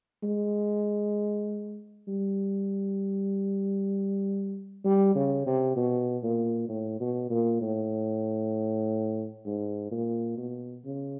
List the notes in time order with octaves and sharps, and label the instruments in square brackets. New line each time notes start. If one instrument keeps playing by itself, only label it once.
[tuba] G#3
G3
G3
C#3
C3
B2
A#2
A2
B2
A#2
A2
G#2
A#2
B2
C#3